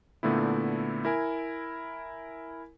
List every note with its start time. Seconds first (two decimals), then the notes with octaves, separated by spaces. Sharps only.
0.23 A#2 D3 A3 B3 E4
1.05 E4 A#4 G#5